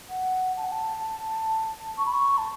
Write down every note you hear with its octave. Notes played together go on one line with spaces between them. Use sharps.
F#5
A5
F#5
A5
C#6
B5
C#6
A5